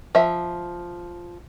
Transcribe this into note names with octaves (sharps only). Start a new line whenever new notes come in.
F3 E5